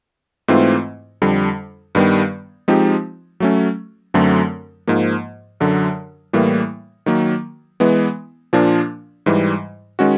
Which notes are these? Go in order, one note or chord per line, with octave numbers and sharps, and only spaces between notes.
G#2 E3 A3 C4 F4
F2 D3 G3
G2 D#3 G3 B3
F3 G#3 C4 D#4 G4
F#3 A3 C#4
F#2 D3 F#3 A3 C4
G#2 F3 A#3
F#2 D3 F#3
A2 E3 G3 A#3
D#3 F#3 A#3
E3 G#3 B3
A#2 F3 A#3 D4 F4
G#2 E3 G3
D#3 G#3 C#4 F#4